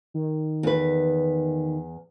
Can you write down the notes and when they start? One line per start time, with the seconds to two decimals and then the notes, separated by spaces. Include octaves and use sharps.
0.14 D#3
0.63 E2 B4